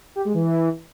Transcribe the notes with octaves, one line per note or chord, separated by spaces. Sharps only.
G4
G#3
E3